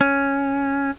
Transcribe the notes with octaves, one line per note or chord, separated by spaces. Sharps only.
C#4